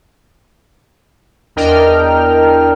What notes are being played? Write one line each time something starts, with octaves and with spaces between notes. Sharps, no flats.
E2 D4 A#4 D#5 G5 F6